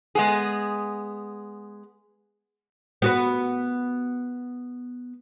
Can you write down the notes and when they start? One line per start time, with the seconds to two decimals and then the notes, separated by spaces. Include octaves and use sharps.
0.15 G#3 B3 G#4
3.02 B3 F#4 B4